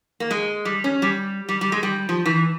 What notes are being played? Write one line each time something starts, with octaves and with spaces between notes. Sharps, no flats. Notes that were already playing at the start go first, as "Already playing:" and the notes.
A#3
G#3
G3
C#4
G3
G3
G3
G#3
G3
F3
E3